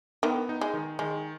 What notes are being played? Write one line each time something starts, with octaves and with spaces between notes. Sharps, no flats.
D#3 B3
D#4
G#3
D#3
D#3 G#3